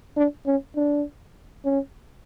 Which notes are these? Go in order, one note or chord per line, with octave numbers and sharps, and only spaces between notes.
D4
C#4
D4
C#4